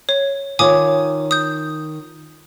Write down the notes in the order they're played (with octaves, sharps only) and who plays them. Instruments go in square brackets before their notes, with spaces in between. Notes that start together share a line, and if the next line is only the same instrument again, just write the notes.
[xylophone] C#5
[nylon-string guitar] D#3 F4 C#5 [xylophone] G#5 D6 D#6
[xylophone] D#6 G6